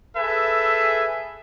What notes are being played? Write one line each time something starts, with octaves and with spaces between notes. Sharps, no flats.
G#4 A4 B4 E5 G#5